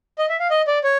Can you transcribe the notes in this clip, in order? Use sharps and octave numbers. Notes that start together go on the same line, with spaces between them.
D#5
E5
F5
D#5
D5
C#5